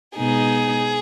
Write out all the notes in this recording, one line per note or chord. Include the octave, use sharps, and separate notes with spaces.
B2 G#3 B3 D#4 G#4